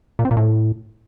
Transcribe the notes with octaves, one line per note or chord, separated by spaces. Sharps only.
A#2
C4
A#2
A2